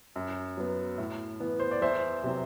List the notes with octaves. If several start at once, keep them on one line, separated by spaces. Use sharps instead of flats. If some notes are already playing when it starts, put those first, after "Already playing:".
F#2
F#3 B3
A2
E3 B3
C5
D5
E2 C5 E5
C3 F#3 C4